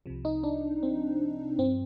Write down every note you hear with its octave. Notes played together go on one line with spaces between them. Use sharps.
C2 C3 F3
D#4
D4
C4
G2 F3 C4